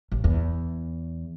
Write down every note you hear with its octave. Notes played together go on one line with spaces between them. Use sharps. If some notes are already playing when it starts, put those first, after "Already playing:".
A1
E2